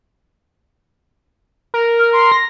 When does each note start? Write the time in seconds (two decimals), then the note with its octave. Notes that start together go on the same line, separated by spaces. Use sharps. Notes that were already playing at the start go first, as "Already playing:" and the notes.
1.74 A#4
1.99 F6
2.13 C6
2.32 A#6